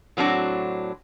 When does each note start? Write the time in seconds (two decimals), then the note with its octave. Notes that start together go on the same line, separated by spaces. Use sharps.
0.17 A2 F#3 C4 D4 F#4